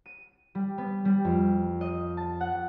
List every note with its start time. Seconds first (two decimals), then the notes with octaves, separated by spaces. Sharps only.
0.06 D#7
0.55 G3
0.78 B3
1.05 G3
1.25 F2
1.81 D#5
2.17 A5
2.41 F#5